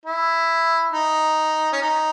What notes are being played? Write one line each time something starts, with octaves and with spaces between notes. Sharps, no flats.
E4
D#4
C#4
D#4